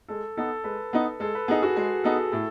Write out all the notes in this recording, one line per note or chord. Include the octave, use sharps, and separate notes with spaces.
G#3 A4
B3 D#4 A4
G#3 B4
B3 D#4
G#3 A4
B4
B3 D#4 G#4
F#4
G#3 G#4
B3 D#4 A4
A2 A4